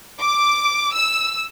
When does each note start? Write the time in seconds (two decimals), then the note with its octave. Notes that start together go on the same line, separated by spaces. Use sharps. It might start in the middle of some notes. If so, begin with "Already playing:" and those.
0.20 D6
0.94 E6